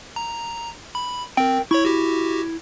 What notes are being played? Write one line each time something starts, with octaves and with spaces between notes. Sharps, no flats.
A#5
B5
C4 A#4 G5
E4 C#5 B5 C#6
F#4 G4